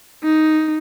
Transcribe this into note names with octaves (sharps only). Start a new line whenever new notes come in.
D#4